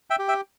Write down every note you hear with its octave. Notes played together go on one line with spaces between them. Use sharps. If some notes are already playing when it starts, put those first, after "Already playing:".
E5 G5
G4
E5 G5